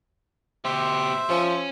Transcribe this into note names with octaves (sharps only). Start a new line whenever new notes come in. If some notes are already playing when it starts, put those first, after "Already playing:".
B2 G4 C5 E5
F3 C#4